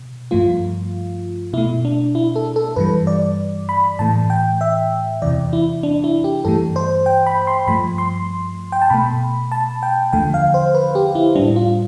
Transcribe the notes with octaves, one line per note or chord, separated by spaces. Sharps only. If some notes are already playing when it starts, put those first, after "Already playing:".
Already playing: B2
G2 F3 A3 F4
B2 A3 E4
D4
E4
A4
A4
G2 E3 G3 B4
D5
B5
A2 E3 A3 A5
G5
E5
E2 C3 E3 D5
E4
D4
E4
G4
G2 E3 A3 A4
C5
G5
B5
C6
G2 F3 A3 B5
C6
G5
A5
B2 A3 B5
A5
G5
E2 D3 F3 A3 G5
F5
C5
B4
G4
E4
A2 G3 D4
F4